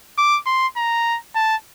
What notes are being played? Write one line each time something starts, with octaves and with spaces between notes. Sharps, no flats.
D6
C6
A#5
A5